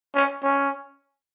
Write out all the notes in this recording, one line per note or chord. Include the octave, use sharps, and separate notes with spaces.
C#4
C#4